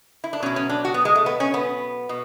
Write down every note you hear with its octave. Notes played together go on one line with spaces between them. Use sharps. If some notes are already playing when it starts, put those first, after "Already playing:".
E4
D4
B2 F#3 C#4
C#4
D4
F#4
B3
G#3
A3
B3
C#4
B3
B2